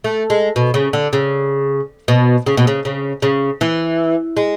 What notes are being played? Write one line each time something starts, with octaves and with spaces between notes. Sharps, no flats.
A3
G#3
B2
C#3
D3
C#3
B2
C#3
B2
C#3
C#3
C#3
E3
G#3